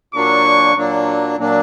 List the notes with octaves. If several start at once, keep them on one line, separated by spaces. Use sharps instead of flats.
A#2 F#3 A#3 D4 C#6
A#2 F#3 A#3 D4
A#2 F#3 A#3 D4